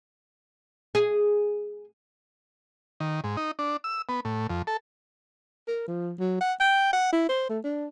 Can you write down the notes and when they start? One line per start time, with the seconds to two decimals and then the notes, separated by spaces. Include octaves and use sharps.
0.95 G#4
3.00 D#3
3.24 G#2
3.37 D#4
3.59 D4
3.84 E6
4.09 B3
4.25 A2
4.50 F2
4.67 A4
5.68 A#4
5.88 F3
6.20 F#3
6.41 F#5
6.60 G5
6.93 F#5
7.13 E4
7.29 C5
7.49 A3
7.64 D4